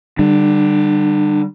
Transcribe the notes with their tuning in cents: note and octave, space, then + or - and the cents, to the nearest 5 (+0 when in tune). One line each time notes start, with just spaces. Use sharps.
D3 +0 G3 +0 D4 +40